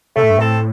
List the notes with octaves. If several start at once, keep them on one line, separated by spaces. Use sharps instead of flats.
C3 A3
A2
G2
A2 C4 A4